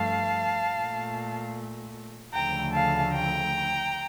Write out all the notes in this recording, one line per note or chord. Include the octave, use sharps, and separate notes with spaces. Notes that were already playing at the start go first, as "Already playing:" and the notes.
Already playing: G2 F3 A3 F5 A5
A#2 A3
D2 C#3 F3 A3 G5 A#5
F5 A5
G5 A#5